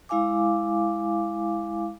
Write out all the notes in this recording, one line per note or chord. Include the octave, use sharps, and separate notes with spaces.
G#3 E4 F5 G#5 D6